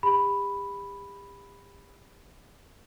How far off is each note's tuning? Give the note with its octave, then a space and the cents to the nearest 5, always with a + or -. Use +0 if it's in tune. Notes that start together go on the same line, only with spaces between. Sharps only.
G4 +40 B5 +0